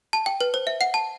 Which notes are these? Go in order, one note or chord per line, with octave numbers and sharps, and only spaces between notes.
A5
G5
B4
C5
E5
F#5
A5